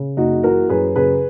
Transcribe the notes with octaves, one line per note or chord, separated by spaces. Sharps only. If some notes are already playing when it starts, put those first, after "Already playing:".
Already playing: C#3
F#1 D#4 F#4
E3 F#4 A#4
F#2 G#4 B4
C#3 G#4 B4